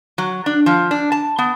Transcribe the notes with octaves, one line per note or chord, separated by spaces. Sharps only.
F#3
D4
F3
D4
A5
B3